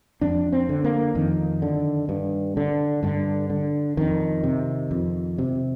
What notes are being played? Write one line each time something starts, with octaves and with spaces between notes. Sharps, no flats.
F2 D4
C4
D3
A#3
F2 D#3
D3
G2
D3
G2 D3
D3
F2 D#3
C3
F2
C3